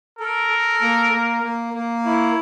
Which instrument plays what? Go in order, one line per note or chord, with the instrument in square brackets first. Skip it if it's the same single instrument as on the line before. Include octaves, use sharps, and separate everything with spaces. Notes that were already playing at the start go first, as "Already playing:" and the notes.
[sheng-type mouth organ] A4 [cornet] A#4
[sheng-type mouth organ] A4
A#3
A#3
A#3
A#3
[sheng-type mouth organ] E4 [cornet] C#5